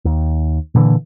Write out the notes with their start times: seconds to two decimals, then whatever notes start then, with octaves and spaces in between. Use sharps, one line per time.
0.05 D#2
0.75 A#2 D3 E3